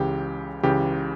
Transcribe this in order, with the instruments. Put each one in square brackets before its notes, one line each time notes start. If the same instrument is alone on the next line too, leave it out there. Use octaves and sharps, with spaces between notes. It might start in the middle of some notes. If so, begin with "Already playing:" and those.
Already playing: [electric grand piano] C#2 C#3 E3 G4
C#2 C#3 E3 G4